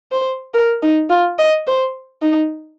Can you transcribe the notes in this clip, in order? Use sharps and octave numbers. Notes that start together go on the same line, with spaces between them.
C5
A#4
D#4
F4
D#5
C5
D#4